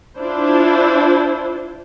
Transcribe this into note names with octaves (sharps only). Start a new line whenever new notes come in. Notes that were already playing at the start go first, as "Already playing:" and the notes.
D4 E4 F4 C5